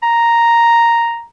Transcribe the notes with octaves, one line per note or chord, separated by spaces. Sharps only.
A#5